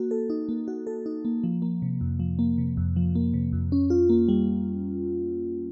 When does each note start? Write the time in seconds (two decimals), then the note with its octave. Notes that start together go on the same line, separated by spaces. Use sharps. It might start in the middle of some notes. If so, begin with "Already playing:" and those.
Already playing: A#3 F#4
0.11 A4
0.30 D#4
0.49 A#3
0.68 F#4
0.87 A4
1.06 D#4
1.25 A#3
1.44 F3
1.62 A#3
1.82 C3
2.01 F2
2.20 F3
2.39 A#3
2.58 C3
2.77 F2
2.96 F3
3.15 A#3
3.34 C3
3.53 F2
3.72 C#4
3.90 F4
4.09 A#3
4.28 G3